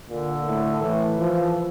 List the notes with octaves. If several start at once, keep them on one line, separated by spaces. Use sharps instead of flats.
A#2 D3
A2
A2 E3
F3